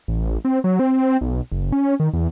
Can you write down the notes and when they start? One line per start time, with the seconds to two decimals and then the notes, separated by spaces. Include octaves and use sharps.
0.08 A1
0.45 C4
0.64 F#3
0.79 C4
1.21 B1
1.52 F#1
1.72 C#4
2.00 D#3
2.13 E2